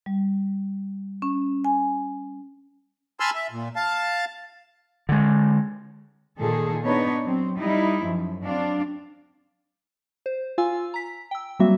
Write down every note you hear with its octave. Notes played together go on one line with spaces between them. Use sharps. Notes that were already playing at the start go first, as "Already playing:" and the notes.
G3
C#4
G#5
G#5 A5 B5 C6 E6 F6
E5
A#2
F5 A5
D3 G#3
A#2 D#3 G#4 A4
B3 D4 D#4 B4 C#5
F#3 C4
G3 D#4 E4
F#2 F3
F#3 C4 D4 F5
C5
F4 F5 G#5 E6
A#5 B6
G5 E6
F#3 G3 A#3 C4 F#4 E5